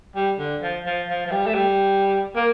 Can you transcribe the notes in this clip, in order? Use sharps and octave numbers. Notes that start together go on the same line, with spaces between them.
G3
D3
F3
F3
F3
F3
G3
A3
G3
A#3